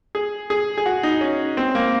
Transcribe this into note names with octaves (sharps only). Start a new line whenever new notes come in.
G#4
G#4
G#4
F#4
D#4
C#4
C4
A#3